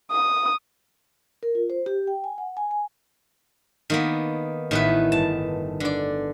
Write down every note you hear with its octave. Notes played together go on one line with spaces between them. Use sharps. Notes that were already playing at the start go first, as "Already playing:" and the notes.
D#6
A#4
F4
C5
G4
G5
G#5
F#5
G#5
G#5
D#3 A#3 B3
A1 D#3 B3 E4 B4
G1 A5
D3 D4 D5